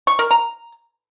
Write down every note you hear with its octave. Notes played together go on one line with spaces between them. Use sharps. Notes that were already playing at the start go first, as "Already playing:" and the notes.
C#6
A#4
A#5